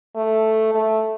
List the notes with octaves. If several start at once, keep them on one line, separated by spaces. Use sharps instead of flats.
A3
A3